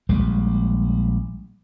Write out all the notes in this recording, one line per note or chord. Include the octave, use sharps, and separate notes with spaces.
A#1 G3 G#3